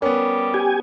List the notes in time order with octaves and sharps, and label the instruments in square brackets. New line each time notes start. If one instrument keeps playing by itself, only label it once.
[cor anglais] G3 [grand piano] B3 C#4 [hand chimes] A#4
[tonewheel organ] G4 G#5